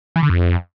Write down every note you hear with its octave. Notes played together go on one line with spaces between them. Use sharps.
E3
D3
F2